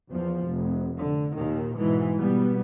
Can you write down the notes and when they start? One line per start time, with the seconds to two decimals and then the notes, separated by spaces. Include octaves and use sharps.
0.10 E2 F3
0.47 F1
0.99 D3
1.35 D#2 A#2 D#3
1.77 G#2 B2 E3
2.16 B2 G3 B3